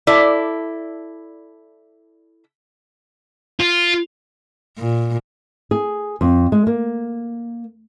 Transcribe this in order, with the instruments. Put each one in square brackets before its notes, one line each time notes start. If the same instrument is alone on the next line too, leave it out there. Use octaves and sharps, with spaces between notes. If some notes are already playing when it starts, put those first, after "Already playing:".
[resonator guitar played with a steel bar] E4 A4 D5
[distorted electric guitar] F4
[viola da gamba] A#2
[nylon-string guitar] G#4
F2
G#3
A#3